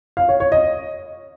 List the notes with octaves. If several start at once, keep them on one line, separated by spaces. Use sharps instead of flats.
F5
C#5
C#5
D#5